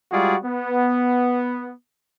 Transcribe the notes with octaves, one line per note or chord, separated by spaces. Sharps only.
G3 G#3 F4 F#4 G#4 D5
B3